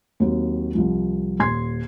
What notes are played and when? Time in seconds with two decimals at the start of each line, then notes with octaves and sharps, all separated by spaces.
0.20 D#2 F#3 C4
0.75 C2 F3
1.39 D#1 C6 G#6 C7